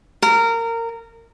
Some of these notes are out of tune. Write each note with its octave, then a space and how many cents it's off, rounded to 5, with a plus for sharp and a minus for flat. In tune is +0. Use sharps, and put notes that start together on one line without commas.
A#4 -20